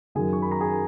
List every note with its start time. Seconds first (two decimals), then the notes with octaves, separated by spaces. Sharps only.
0.15 F#2 D#3 F#3 G#4 G#5
0.33 C#6
0.42 B5
0.51 A#5
0.61 G#4 G#5